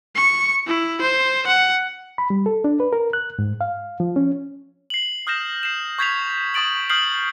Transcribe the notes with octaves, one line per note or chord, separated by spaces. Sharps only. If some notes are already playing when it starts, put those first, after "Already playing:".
C#6
E4
C5
F#5
B5
G3
A4
D4
B4
A#4
F#6
G#2
F5
F3
C#4
C7 F#7
D#6 F6 G6 A#6 E7
C7 E7
C#6 G6 G#6 B6 C7 F7
C#6 D#6 A6 D7 F#7
D#6 F6 G6 C7 F#7